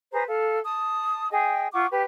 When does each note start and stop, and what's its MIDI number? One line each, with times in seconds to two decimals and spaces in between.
0.12 0.23 68
0.12 0.23 71
0.12 0.23 72
0.12 0.23 82
0.28 0.58 69
0.28 0.58 77
0.64 1.30 81
0.64 1.30 87
1.31 1.67 68
1.31 1.67 75
1.31 1.67 79
1.72 1.86 65
1.72 1.86 78
1.72 1.86 85
1.72 1.86 86
1.90 2.03 67
1.90 2.03 71